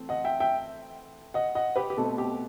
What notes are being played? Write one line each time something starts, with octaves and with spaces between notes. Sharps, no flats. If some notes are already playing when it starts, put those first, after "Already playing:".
Already playing: E3 A3 C4
D#5 F#5
E5 G5
E5 G5
D#5 F#5
D#5 F#5
G4 B4
G4
B2 A3 C4 A4
G4